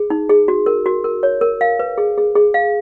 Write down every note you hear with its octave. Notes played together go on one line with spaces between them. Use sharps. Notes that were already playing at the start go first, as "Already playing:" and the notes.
Already playing: G#4
D#4
G#4
F#4
A#4
F#4
A#4
C#5
A#4
F5
B4
G#4
G#4
G#4
F5